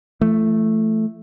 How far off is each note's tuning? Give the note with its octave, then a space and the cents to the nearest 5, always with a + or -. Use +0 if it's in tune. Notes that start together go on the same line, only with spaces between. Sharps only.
E3 +45 A3 +0